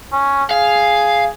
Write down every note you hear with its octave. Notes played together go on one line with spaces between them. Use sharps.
C#4
G#4 F5